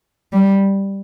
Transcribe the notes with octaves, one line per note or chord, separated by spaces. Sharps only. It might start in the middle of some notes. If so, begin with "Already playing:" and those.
G3